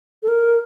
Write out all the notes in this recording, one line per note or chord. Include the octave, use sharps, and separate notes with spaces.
A4
A#4